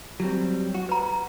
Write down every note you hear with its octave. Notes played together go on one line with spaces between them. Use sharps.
F#3 G3 C4
F#4
B4 A#5